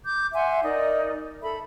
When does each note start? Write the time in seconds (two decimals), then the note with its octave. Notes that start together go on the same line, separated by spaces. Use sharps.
0.04 D6 G6
0.33 E5 F#5 G#5 C6
0.63 D#4 A#4 D5 D#5
1.42 A4 E5 B5